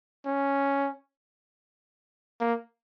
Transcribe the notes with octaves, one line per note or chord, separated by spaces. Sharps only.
C#4
A#3